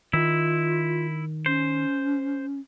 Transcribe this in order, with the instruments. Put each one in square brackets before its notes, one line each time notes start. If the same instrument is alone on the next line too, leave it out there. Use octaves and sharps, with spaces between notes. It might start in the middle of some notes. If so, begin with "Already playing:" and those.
[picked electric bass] D#3 [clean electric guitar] E4 [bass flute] F4
[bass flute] C#4 [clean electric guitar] C5